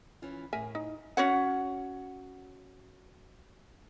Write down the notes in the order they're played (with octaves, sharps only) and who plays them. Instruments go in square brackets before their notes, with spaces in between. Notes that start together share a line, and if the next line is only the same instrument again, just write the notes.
[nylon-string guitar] E3 C#4 F4
[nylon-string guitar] A2 [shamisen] A#4 E5 G#5
[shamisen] D#4
[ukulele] C#4 F#4 C#5 F#5